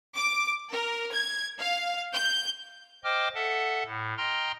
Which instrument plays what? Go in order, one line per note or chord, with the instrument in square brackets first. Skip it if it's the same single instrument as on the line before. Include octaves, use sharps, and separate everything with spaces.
[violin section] D6
A#4
G#6
F5
G6
[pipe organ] C5 D#5 G5 D6 F6
A4 E5 F#5 A5
A2
D#5 G5 A#5 C6 F6